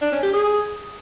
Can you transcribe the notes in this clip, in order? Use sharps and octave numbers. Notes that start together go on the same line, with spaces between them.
D4
C#4
G4
G#4